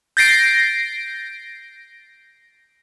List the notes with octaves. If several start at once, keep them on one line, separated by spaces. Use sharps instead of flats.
G6 A6 A#6 C7 D7